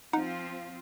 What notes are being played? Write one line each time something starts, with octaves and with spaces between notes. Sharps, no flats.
F3 C4 D#4 F4 F#5